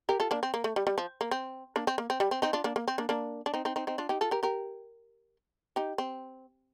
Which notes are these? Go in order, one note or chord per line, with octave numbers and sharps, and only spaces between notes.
G4 A#4
F4 A4
A#3 D4
C4
A#3
A3
G3
G3
F3
A#3
C4
A#3 D4
C4
A#3
C4
G3
C4
C4 D#4
D4 F4
A#3 D4
A#3
C4
A#3 D4
A#3 D4
D4
C4 D#4
C4 D#4
C4 D#4
C4 D#4
D4 F4
D#4 G4
F4 A4
G4 A#4
G4 A#4
D#4 G4
C4